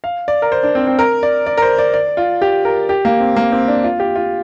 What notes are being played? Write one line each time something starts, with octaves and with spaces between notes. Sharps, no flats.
F5
D5
A#4
C5
D4
C4
C4
A#4
D5
D5
A#4
C5
D5
D5
F4
G4
A#4
G4
A#3
C4
A#3
C4
D4
F4
G4
F4